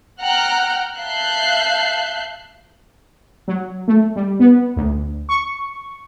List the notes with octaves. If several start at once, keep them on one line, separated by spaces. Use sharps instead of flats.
F#5 G5 A#5 F6 F#6
E5 F5 A5 F#6 G6 C7
F#3
A3
G3
B3
D2
C#6